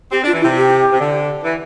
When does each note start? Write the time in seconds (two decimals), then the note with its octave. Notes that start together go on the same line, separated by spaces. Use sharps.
0.12 C4 G4
0.24 D4
0.27 F4
0.33 E3
0.41 E4
0.44 C3
0.57 G4
0.92 C3
1.00 D3
1.44 E3